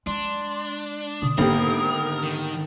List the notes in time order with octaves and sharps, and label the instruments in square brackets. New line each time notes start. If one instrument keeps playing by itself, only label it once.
[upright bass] G#3 [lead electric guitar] D4 [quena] C6
[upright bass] B2 D3 [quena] D#6
[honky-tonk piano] G#1 D3 G4 [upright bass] A#3 B3 [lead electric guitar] A#4
[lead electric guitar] D#3